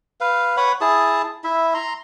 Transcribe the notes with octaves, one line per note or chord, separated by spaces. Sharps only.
B4 F5
B4 C#5 F#5 B5
E4 G#4 A5 D#6
E4 E5
A#5 C6